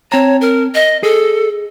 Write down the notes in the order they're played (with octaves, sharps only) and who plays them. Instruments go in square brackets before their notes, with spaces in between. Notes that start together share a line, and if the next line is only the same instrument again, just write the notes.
[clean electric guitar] C4 A5 A#5 [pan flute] C#5
[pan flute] A#4
D#5
[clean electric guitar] G#4 [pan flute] A4